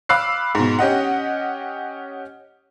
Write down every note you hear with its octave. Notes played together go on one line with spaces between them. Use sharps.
F5 B5 D6 E6 F#6 C7
G#2 B2
C#4 G4 D#5 F#5